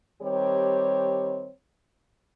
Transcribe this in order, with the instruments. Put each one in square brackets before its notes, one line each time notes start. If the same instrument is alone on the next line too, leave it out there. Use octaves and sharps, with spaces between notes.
[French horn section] D#3 G3 C4 G4 C#5